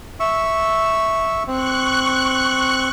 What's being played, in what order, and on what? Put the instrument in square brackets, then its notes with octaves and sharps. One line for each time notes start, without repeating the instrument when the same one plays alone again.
[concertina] E5 C#6 E6
[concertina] C4 [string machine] C#6 F#6